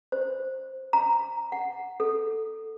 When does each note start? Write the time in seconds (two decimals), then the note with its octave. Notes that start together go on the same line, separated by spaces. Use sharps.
0.12 C5
0.93 A#5
1.52 F#5
2.00 A4